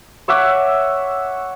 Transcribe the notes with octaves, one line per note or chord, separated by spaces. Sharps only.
C#5 E5 F#5 D6